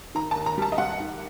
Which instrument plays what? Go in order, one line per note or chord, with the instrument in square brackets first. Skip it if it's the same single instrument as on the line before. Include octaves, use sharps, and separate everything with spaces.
[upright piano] D#3 A#5
A5
D#2
A#5
G3 A5
D#5
G3 F#5
D#3